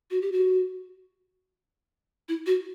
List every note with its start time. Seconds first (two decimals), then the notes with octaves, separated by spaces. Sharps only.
0.11 F#4
0.22 G4
0.32 F#4
2.29 E4
2.46 F#4